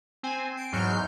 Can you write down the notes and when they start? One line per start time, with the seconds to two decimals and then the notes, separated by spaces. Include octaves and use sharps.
0.23 C4 G#5
0.57 C7 D7
0.72 E2 G#2 F#3 F6 G6